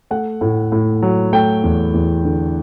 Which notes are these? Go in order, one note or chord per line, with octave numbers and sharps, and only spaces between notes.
A3 F#5
A2
A2
F#3
A3 G5
E2
E2
D3